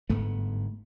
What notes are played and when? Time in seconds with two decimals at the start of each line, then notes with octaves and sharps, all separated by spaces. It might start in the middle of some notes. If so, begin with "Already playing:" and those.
0.10 G1 G#2 A3 B3